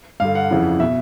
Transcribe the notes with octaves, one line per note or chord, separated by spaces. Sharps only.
G2 D3 F5
F#5
F2 C#3 E3
B2 E5